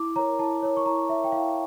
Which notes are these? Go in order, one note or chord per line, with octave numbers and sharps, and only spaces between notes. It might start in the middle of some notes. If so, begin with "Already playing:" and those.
Already playing: E4 D6
A#4 C#5 A#5
E4 A5
A#4 C#5
C#6
E4 A#5
A#4 C#5 E5
G5
E4 F5